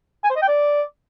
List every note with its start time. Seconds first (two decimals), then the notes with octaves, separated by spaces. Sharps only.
0.24 G#5
0.30 C5
0.36 D#5
0.42 G5
0.48 D5